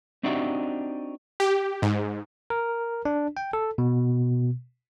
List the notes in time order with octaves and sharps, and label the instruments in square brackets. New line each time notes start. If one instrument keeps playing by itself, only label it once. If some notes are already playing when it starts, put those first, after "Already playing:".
[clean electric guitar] C4 D4 D#4 F#4 G4 E5
[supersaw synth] G4
G#2
[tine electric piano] A#4
D4
G5
A4
B2